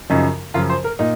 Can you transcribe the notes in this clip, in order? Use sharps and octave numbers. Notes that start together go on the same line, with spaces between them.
F#2 C#3 F3 D#4
F#2 C#3 F3 F4
C5
A#4
A#2 D#4